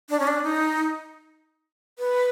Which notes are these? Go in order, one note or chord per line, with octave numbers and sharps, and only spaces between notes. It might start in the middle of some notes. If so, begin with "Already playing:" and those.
D4
C#4
D4
D#4
B4